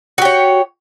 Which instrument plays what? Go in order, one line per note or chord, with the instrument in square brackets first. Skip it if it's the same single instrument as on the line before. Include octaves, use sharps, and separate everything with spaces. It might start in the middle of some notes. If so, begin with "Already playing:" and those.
[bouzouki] F#4
G4
C#5